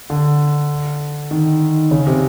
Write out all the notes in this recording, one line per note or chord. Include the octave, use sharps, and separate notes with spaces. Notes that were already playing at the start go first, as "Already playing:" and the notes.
D3
D#3
C#3
C3